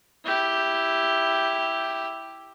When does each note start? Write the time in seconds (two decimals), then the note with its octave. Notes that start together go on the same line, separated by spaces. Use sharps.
0.24 E4 G4